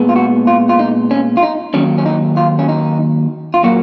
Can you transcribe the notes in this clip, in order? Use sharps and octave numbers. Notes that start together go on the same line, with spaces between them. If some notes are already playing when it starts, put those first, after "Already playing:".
Already playing: A#2 G#3 B3
F4
F#4
F4
F4
D#4
C#4
F4
D#4
D#2 D#3 F#3 C#4
C#4
D#4
F4
C#4
D#4
F4
A#2 F#3 A#3 F#4